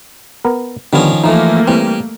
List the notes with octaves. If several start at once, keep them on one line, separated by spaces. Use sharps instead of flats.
B3 A#4
D3 D#3 F3 G3 B3 C#4
E3 F3 A3 A#3 D#4
E3 G3 C4